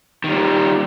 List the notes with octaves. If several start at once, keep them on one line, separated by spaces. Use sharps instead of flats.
D#3 G3